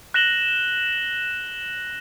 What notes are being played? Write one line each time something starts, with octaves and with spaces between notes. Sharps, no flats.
F#6 A#6 E7 F#7 G7